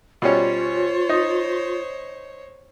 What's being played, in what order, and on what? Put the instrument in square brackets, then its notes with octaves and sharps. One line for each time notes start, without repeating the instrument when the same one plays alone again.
[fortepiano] B2 G3 C#4 [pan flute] F4 [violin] C5 C#5
[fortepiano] D#4